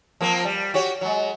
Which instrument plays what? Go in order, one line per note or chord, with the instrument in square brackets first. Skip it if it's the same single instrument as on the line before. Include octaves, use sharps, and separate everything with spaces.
[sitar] F3 A#3 C4
G3
F#4 G4 C#5
F#3 G#3